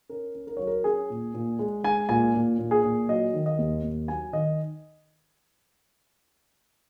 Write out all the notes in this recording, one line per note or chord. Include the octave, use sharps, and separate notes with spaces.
C#4 A#4
C#4
A#4
F#3 C#5
A#4
C#4 G#4
A#2
A#2
G#3
G#3 G#5
A#2 G#5
A#2
A#2
G#4
A#2
F#3 D#5
D#3
D#5
D#2
D#2
F#3 G#5
D#3 D#5